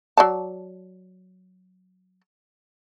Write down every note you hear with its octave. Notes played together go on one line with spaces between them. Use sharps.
F#3 D5 A5